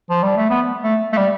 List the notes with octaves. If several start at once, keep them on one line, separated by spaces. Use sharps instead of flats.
F3
G3
A3
B3
A3
A3
G3